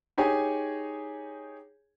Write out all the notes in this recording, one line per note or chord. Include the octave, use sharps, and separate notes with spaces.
D#4 G4 G#4 C#5 G#5